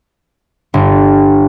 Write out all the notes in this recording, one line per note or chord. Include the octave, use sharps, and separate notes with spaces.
G1